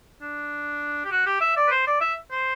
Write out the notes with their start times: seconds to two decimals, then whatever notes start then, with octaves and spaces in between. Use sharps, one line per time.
0.21 D4
1.04 G4
1.11 F#4
1.26 G4
1.41 E5
1.57 D5
1.67 B4
1.71 C5
1.87 D5
2.01 E5
2.31 C5